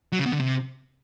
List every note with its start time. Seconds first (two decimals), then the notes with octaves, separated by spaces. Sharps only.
0.12 F#3
0.19 C#3
0.26 B2
0.33 D3
0.40 C3